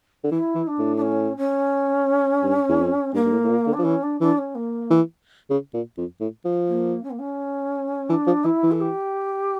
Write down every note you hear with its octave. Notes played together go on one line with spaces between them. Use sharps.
D3
E3 E4
E3
D4
A2
D4
C#4
C#4
G2
E2
F2
G2 A#3
G2
A2
A2
A#2
D3
D4
F3
E3 C#4
D4
E3 D4
C#4
A#3
E3
C#3
A#2
F2
A2
F3
A#3
C#4
A#3
C#4
E3 D4
F3
E3 E4
E3
A4
G4